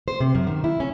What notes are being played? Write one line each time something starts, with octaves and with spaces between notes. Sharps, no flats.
C5
C3
F#2
D#3
E4
C#4